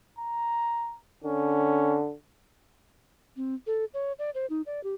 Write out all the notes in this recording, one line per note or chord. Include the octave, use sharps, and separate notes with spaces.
A#5
D3 C#4
C4
A4
C#5
D5
C5
D#4
D5
G4